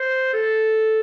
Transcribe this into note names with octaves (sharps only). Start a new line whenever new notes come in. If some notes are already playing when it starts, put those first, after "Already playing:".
Already playing: C5
A4